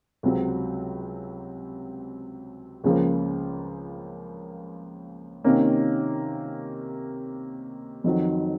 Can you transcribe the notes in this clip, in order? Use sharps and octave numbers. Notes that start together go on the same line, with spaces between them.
C#2 C3 F#3 C4
C#2 C#3 F3 A#3
C3 D#3 A#3 C#4
F2 D#3 F#3